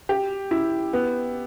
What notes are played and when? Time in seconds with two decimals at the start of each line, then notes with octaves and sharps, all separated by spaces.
0.09 G4
0.51 E4
0.93 B3